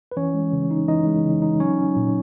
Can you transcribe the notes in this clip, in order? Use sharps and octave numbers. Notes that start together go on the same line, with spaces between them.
B4
E3 C#4 C#5
G#3
C#3
D#4
E3 D#4 D#5
G#3
C#3
D#4
F#3 C#4 C#5
C#4
A#2